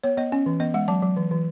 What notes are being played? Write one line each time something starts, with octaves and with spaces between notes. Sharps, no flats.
B3 C#5
B3 D#5
C#4
E3
B3 D#5
G#3 F#5
F#3 A5
F#3
E3
E3